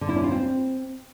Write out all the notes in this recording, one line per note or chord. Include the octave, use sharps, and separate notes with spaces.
D3
E4
C#4
F4
C4